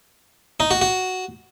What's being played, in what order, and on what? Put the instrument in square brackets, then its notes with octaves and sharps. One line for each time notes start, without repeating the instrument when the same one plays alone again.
[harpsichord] D#4
F#4
F#4